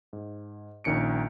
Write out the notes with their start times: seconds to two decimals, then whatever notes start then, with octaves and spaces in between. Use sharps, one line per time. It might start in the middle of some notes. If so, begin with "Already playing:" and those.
0.13 G#2
0.84 A#1 D#3 C#4 C#7 D7